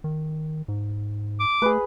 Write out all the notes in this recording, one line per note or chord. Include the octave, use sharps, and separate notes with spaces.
D#3
G#2
D6
A3 G#4 B4